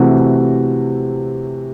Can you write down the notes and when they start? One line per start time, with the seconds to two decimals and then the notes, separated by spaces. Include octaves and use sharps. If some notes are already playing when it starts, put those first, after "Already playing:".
Already playing: C3 E3 A3 C4 F#4